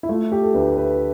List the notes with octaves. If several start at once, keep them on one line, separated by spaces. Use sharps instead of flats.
E4
A3 F4
G4
A4
D2 B4
B4